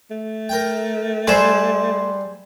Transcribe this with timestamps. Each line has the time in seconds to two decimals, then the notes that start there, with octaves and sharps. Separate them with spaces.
0.10 A3
0.49 A#4 G5
1.27 G3 G#4 A4 B4 C5